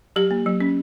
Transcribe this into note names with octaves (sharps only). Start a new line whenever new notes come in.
F#3 G4
A#3
F#3
C#4